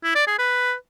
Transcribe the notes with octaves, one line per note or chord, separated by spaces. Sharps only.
E4
D5
G#4
B4